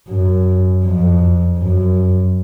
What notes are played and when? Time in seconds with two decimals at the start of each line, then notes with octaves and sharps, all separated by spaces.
0.09 F#2
0.84 F2
1.59 F#2